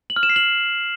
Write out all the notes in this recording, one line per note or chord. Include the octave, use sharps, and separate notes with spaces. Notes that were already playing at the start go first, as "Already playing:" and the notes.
F#7
F6
E7
C7
F#7